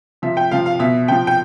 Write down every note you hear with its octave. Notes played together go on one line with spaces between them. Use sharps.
C3 F3 E5
G5
C3 F3 F5
F5
B2 E5
C3 F3 G5
G5